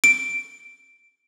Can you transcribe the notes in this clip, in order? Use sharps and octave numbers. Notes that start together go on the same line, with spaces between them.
D7